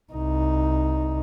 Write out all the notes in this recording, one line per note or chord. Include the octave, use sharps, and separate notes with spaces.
C2 D#4